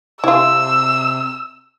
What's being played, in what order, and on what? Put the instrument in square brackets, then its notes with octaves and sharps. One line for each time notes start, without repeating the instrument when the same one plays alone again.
[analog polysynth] C3 [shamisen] E4 F4 [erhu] E6